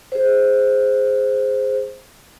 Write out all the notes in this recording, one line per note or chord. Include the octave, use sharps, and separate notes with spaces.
G#4 C5